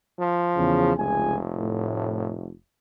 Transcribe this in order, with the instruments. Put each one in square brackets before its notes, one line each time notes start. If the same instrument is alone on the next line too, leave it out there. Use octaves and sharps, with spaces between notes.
[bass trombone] F3
[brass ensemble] E2 C#3
[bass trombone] F1 [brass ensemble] C#2 G#4 G#5
[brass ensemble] A2